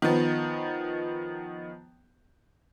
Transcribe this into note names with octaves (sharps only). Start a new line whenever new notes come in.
D#3 F3 B3